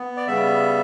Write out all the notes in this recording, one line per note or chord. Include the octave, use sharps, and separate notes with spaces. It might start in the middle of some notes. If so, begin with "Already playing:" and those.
Already playing: B3
D5
C#3 G3 B3 E5